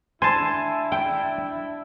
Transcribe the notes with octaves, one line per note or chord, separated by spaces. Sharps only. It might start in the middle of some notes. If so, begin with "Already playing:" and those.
D4 E4 C5 G#5 A5
G5